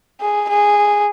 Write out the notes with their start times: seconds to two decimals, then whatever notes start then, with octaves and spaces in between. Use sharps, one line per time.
0.21 G#4
0.49 G#4